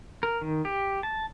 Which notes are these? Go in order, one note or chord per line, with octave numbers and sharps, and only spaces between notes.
A#4
D#3
G4
A5